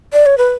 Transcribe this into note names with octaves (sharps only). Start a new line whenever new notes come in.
D5
C#5
B4